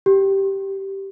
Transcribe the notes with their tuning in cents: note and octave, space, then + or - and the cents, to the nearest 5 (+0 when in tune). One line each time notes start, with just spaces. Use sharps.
G4 -10